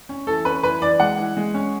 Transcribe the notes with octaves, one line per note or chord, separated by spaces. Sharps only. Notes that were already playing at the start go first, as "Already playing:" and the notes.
C#4
E3 A4
C#4 B4
E3 B4
E3 D5
G#3 F#5
E3
G#3
C#4